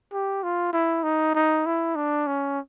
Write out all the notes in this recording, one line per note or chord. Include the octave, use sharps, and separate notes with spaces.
G4
F4
E4
D#4
D#4
E4
D4
C#4